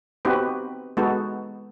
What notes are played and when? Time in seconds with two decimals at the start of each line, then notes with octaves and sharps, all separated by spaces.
0.25 B3 C4 D#4 F#4 G4 B4
0.97 G#3 B3 D#4 F#4 A4